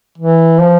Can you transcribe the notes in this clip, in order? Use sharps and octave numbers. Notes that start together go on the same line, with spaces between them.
E3
F3